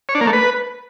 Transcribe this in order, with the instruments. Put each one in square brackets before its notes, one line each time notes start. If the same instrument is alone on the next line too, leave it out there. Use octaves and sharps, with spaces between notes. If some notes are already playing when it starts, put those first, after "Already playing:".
[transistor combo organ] C#5
D4
A#3
A3
B4